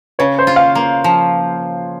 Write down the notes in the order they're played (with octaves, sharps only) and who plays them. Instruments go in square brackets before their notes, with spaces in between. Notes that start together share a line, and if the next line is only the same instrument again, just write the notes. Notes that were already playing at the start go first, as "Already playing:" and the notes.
[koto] C#3 [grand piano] C#5
[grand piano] C5
[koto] F4
[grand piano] F5
[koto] A#3
F3